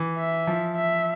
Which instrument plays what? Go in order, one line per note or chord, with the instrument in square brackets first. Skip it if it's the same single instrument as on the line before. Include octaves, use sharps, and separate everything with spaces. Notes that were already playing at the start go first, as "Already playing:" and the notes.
Already playing: [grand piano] E3
[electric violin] E5
[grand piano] F3
[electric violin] E5